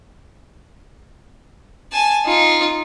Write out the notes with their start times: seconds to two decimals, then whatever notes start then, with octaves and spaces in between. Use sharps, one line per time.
1.92 G#5 A5
2.25 D#4 F4